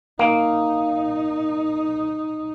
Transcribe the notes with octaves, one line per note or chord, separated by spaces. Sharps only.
A#3 D#4